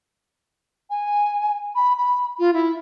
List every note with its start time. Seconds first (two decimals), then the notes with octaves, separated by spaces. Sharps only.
0.90 G#5
1.75 B5
1.97 B5
2.39 F4
2.54 E4